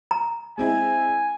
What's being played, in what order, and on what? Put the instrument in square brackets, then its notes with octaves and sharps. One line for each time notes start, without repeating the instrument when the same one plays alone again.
[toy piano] A#5
[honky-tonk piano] G#3 C4 E4 [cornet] G#5